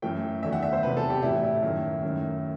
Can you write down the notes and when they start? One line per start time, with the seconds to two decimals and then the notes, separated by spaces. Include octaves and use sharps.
0.02 F#2 E3 A3 G5
0.43 E2 D#3 F#3 A3 E5
0.53 F#5
0.63 E5
0.73 C5
0.83 E2 C3 F#3 B4
0.97 A4
1.10 G4
1.22 A2 E3 A3 E4
1.43 E4
1.62 F#2 D#3 A3
2.03 F#2 D#3 A3